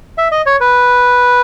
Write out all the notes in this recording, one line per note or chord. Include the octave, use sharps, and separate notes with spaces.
E5
D#5
C#5
B4